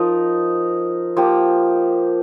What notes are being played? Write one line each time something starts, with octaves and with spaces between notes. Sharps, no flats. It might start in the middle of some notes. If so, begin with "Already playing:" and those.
Already playing: F3 D#4 A#4 D#5
F3 A#3 G4